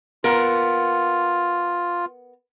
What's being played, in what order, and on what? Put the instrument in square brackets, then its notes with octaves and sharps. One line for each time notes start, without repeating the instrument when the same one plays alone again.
[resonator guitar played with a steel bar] B3 A#4 [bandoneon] F4